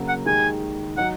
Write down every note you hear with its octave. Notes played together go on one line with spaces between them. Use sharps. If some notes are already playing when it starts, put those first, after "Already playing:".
Already playing: C#3 F#3 A#3 F#4 A#4
F#5
D#2 D#3 G#3 G#5
F#3 D#4 F#5